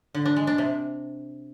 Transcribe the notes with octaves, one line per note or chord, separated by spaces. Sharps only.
D3
D4
G#3
D4
C3